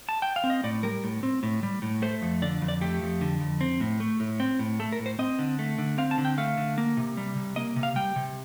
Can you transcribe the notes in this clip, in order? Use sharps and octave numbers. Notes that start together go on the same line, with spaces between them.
A5
G5
F5
C4
D#5
A2 D5
G3 A#4
A2
C4
A2
G3
A2
A3 C5
F2
D3 D5
F2
D5
A3 G4
F2
D3
F2
C4
A2
A3
A2
C4
A2
A3 A4
A#4
A2
C5
C4 D#5
D3
A3
D3
C4 F5
A5
D3
G5
A3 F5
D3
A#3
C3
G3
C3
A#3 D#5
C3
F5
G3 G5
C3